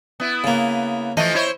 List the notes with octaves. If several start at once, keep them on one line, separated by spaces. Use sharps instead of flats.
B3 E4
C#3 A#3
E3 F3 A3 D#5
E4 C5 C#5